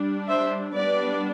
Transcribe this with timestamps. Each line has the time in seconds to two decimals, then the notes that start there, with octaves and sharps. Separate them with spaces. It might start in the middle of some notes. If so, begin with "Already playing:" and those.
Already playing: G3 D4
0.28 C5 E5
0.76 G3 B3 D4 B4 D5